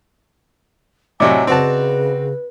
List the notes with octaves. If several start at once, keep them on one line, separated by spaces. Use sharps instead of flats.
A2 C3 F#3 D5 D#5 G#5 D6
C#3 C4 F#4 B4 A5